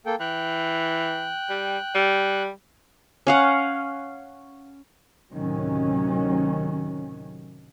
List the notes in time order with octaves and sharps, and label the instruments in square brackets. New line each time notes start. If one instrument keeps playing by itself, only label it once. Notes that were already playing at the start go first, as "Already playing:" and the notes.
[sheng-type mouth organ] A#3 A4 G5
[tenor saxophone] E3 [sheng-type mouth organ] G5 F#6
[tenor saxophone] G3
G3
[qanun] C#4 F5 F#5
[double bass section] D2 A2 C3 D#3 F#3 C#4